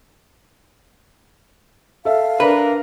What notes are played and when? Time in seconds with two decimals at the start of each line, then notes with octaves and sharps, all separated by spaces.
2.05 A4 E5 F5
2.40 D4 A#4 B4